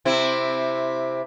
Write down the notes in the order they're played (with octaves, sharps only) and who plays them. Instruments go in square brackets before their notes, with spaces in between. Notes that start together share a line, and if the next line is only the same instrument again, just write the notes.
[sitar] C3 C4 E4